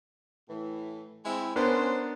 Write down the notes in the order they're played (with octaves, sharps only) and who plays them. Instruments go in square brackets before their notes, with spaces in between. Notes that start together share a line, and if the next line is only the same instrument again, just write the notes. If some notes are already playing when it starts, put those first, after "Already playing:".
[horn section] A2 E3
G#3 C4 E4
[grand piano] B3 D4 A#4 [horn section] C#4 C5